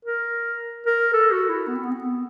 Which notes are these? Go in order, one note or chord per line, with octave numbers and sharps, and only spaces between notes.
A#4
A#4
A4
F#4
E4
B3
C4
B3
C4
B3